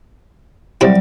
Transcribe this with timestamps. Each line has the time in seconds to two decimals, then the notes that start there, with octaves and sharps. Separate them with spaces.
0.81 C3 F#3 G3 E4 D5